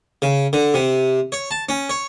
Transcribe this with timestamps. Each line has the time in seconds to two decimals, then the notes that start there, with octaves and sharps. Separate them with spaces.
0.22 C#3
0.53 D3
0.74 C3
1.32 C#5
1.51 A5
1.69 C#4
1.89 C#5